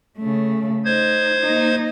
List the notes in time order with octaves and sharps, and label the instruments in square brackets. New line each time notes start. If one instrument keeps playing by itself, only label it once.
[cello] C#3 A3
[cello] D#4 [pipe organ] C5 G#6
[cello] A#3 D#4